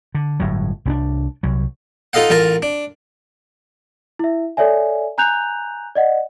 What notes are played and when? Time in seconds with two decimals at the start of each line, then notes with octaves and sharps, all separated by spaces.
0.15 D3
0.40 G1 A2 F#3
0.85 C2 C#4 D4
1.43 C2 F#3
2.13 D#4 F4 A4 D#5 F5 F#5
2.30 A1 F4 A#4 A5 A#5
2.62 D4
4.19 E4 E5
4.57 A4 C#5 D5 E5 G#5
5.18 G#5 A#5 F#6 G6 F7
5.96 D5 D#5 F#5